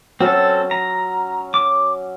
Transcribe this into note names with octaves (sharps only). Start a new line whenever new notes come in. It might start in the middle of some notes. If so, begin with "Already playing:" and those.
F#3 C4 C#4 A4 E6
A#5
D6